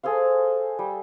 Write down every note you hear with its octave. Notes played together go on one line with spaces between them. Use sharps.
G#4 A4 C5 F5
G3